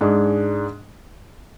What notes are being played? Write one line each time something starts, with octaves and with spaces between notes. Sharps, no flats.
G#2 G#3 D4 G#4